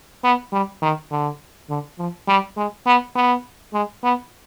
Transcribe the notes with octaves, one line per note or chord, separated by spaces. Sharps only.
B3
G3
D#3
D3
D3
F3
G3
G#3
B3
B3
G#3
B3